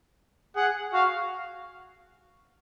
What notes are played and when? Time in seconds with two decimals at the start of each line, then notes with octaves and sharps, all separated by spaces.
0.56 G#4 F#5
0.93 F#4 F5